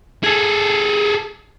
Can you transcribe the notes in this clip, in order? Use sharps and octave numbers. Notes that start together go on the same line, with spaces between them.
G#4 A4